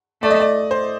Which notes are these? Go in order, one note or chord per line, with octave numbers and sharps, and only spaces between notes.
A3 D5
D#5
D5
C5